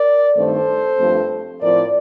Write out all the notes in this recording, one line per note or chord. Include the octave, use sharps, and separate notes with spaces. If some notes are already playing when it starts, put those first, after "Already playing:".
Already playing: A#4 D5
G2 D#3 A3 C4 A4 C5
G2 F3 A3 C4
A2 F3 C4 A#4 D5